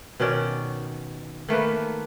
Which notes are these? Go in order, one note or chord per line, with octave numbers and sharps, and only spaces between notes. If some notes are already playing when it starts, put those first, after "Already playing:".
B2 D#3 C#4 D5
D#3 A3 A#3 B4